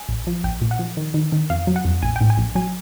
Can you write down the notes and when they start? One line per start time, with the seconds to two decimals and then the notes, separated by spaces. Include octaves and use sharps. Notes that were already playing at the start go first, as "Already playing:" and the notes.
Already playing: G#5
0.09 A#1
0.27 F3
0.44 A#1 G5
0.61 A#2
0.71 F#5
0.79 F3
0.97 D#3
1.14 D#3
1.32 D#3
1.50 F2 F5
1.67 F#3
1.76 F#5
1.85 F2
2.02 A#1 G#5
2.16 A2 G5
2.30 G#5
2.37 A#1
2.55 F#3 G#5